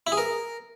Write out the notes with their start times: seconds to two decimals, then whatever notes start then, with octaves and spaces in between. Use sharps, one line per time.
0.07 E4
0.12 G#4
0.18 A#4